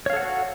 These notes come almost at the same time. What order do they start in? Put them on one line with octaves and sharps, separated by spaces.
C#5 F5 A4 F#5 F#4